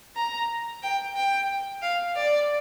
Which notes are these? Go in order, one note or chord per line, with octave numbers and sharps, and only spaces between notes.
A#5
G5
G5
F5
D5